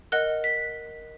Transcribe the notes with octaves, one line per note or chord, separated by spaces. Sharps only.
A#4 D#5 F#5 F#6
B6